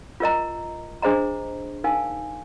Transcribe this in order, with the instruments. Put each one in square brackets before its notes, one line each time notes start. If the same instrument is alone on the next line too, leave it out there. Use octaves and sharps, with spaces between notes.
[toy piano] F4 A#4 D#5 A#5
D4 G#4 C5 D#5 A#5
D#4 A#4 F5 G#5